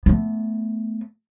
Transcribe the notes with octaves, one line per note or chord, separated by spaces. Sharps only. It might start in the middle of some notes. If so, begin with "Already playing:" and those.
A3 B3